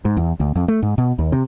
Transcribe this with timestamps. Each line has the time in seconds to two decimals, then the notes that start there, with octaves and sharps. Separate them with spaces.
0.05 G#2
0.17 E2
0.40 D2
0.56 F2
0.68 A3
0.83 G#2
0.98 B2
1.19 D#2
1.32 C3